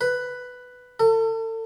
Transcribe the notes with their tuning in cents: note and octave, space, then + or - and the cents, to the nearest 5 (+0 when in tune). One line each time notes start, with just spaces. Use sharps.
B4 +5
A4 +35